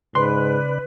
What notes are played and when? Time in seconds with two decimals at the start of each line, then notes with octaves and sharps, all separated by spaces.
0.15 G#2 C#3 B4 D5 C6 F#6